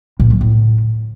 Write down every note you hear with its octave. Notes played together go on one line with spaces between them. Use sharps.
A#2
F#3
A2